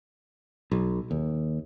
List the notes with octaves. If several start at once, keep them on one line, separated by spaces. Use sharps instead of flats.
B1
D#2